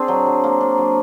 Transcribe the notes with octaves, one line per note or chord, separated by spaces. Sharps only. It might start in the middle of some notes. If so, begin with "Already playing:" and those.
Already playing: C4 D4 G#4
F#3
F#3
A#3
D4
F#3